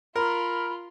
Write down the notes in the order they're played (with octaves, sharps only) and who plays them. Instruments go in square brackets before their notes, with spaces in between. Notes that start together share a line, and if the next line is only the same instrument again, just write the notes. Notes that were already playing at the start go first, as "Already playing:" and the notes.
[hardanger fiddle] F4 [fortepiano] A#4 [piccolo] B5